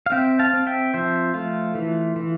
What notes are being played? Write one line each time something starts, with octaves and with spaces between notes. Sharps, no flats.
F5
C4 E5 G5
F5 A5
C4
E5 G5
F3 C5 E5
A3 F4
E3
E3